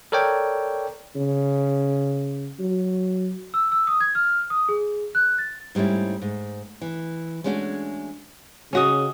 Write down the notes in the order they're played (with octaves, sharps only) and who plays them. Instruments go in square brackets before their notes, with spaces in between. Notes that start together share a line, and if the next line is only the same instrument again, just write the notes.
[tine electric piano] A4 A#4 C#5 D5 G5
[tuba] C#3
F#3
[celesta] E6
E6
D#6
G#6
F6
D#6
G#4
F#6
A6
[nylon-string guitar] G#2 G3 A3 C#4 E4
G#2
E3
G#3 A3 C#4 D4 F#4
[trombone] C#3 [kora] C#4 F#4 D#5